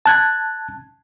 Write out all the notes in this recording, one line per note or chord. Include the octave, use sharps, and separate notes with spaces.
A5 F#6 G#6